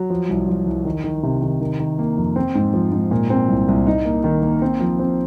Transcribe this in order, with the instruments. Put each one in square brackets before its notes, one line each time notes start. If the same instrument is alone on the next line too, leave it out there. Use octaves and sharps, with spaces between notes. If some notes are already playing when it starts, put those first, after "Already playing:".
Already playing: [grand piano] F#3
F3
C2
F3
C2
D#3
D#3
C3
D#3
D#3
D#3
A#3
F2
C4
G#2
F3
G#2
A#2
C4
C2
C2
D#4
A#3
D#3
A#3
C4
F3
C4